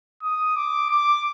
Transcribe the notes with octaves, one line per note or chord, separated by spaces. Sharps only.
D#6
D6
D6